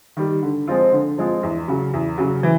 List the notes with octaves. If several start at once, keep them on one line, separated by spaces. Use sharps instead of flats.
D#3 G3
D3
F3 G#3 C4 F4
D3
F3 G#3 C4 F4
E2
C#3 F#3
E2
C#3 F#3
E3